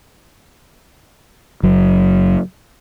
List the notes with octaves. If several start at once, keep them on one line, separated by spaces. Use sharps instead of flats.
F#1 F#3